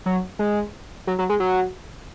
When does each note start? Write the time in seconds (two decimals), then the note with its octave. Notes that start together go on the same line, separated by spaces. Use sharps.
0.06 F#3
0.39 G#3
1.07 F#3
1.19 F#3
1.29 G#3
1.40 F#3